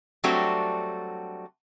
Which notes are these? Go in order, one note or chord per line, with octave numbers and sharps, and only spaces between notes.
F#3 G3 A3 C4 D4 F#4